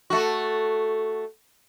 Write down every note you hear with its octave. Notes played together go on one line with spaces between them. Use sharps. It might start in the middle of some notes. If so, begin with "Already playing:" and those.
A3 F#4